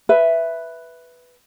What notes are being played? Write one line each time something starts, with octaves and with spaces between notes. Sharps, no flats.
B4 E5